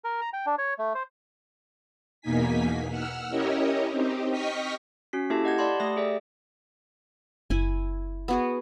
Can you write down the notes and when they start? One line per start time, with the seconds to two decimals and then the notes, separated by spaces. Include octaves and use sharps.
0.04 A#4
0.21 A#5
0.33 G5
0.46 D4
0.58 C#5
0.78 A3
0.95 C5
2.21 E2 B2 A#3 D#4 G#5 B6
2.89 F#5 E6 F6
3.30 C#4 E4 G4 A#4 C#5 D#5
3.91 C4 D#4 G4
4.30 D#5 G5 C#6 D#6 F6 B6
5.13 C#4 F#4 B6
5.30 A#3 E4 G4 A4 E5 A5
5.44 G4 D#5 F#5 G6 G#6
5.58 D5 F#5 A5 B5 C6
5.80 A3 G4 E5 D#6 A#6
5.97 G#4 A4 D5 E5 G5
7.50 F#1 E4 G#5
8.28 B3 F#4 G#4